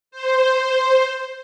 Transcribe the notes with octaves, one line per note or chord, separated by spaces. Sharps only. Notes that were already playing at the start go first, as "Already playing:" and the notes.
C5